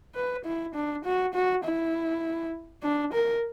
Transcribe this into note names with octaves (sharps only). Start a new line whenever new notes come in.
B4
E4
D4
F#4
F#4
E4
D4
A#4